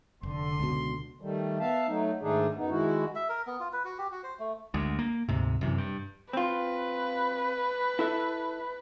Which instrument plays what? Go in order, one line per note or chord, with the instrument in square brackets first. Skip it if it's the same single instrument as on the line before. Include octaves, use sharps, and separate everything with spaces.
[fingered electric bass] F1 [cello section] D3 [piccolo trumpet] C6
[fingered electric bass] C#2 B2
[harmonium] D#3 G3 A3
B3 E5 F5 A5
F#3 A3 D#4
G#2 D#3 A3 D4 D#4 G#4
F#2 B3 D#4
D#3 G#3 E4 F#4
[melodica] E5
A#4
B3
F4
B4
F#4
G4
F#4
C5
A3
[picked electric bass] D2 G#3
A#3
D2 G#2 C3
F#2 C3 E3
G2
[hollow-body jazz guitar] C4 F4 [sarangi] B4
[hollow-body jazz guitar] E4 A4 E5